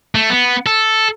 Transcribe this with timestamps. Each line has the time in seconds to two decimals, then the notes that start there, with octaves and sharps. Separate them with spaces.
0.15 A3
0.30 B3
0.66 A4